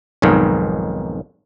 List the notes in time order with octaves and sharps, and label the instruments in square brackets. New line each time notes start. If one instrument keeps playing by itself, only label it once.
[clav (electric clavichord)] B1 F2 G#2 D#3